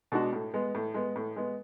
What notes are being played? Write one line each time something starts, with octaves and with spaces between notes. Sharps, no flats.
B2 G#3 D4 F#4
A2
G#3 B3
A2
G#3 B3
A2
G#3 B3